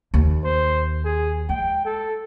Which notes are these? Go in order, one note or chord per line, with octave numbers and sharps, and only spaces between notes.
D#2
C5
G#4
G#3 G5
A4